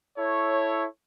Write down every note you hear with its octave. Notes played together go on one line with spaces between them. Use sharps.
E4 A4 C#5